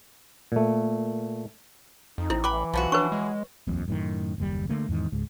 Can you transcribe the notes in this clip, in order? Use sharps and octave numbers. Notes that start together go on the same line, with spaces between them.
A#2 A3
F2 D#4
A1 C4 E4
E3 B4 G5 B5 D6
B1 F3 B3 F#4
D4 B4 C#5 C#6
G#3
D#1 A#1 F2
F#2 A2 D#3
F#1 D#2 G3
D3 A3 A#3
E2 G#2 D#3
C#2 G#2